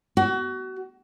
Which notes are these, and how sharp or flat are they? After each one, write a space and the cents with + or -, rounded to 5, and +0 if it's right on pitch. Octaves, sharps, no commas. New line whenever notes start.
F#4 +30